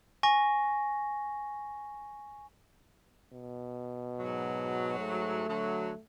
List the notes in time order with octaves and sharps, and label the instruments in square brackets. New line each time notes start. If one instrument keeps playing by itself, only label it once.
[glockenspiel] G#5 C#6 A#6
[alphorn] B2
[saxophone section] G#2 F#3
[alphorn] A3
[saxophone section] D3 F#3